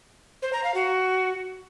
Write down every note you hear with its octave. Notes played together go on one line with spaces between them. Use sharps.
C5
A#5
F5
F#4